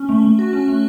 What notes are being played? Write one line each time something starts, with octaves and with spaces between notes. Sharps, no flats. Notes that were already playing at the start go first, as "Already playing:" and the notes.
Already playing: C#4
A3
A3
F#4
C#4
A3